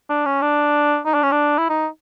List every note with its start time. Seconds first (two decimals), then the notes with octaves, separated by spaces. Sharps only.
0.09 D4
0.25 C#4
0.42 D4
1.05 D#4
1.14 D4
1.23 C#4
1.32 D4
1.58 E4
1.69 D#4